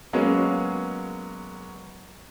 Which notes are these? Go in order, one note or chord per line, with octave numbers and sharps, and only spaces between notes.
F#3 G#3 A#3 B3 C#4